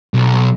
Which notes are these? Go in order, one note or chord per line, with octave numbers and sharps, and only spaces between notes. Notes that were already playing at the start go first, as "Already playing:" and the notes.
B1